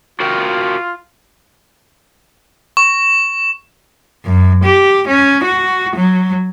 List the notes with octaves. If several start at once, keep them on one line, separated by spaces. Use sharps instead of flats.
F4 F#4 A#4 G5
C#6
F#2
G4
C#4
F#4
F#3